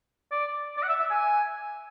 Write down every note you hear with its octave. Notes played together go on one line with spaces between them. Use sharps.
D5
D5
F#5
E5
E5
G#5